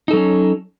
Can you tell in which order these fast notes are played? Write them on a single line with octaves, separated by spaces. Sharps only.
D#4 A4 F#3 C#4